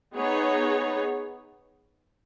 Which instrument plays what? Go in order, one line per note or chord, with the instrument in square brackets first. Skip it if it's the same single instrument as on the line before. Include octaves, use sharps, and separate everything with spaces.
[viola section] B3 D#4 G#4 C#5